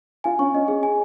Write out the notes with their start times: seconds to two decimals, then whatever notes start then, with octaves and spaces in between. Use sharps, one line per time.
0.24 F4 G#5
0.39 C#4 C#6
0.54 C#4 D#5
0.68 C#4 G#4
0.83 G#5